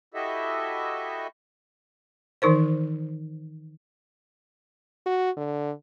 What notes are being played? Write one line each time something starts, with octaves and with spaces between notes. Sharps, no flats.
E4 F#4 G4 A4 D#5 E5
D#3 E3 D#4 A#4 C5
F#4
D3